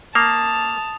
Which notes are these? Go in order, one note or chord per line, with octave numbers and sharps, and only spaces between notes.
A#3 A5 D#6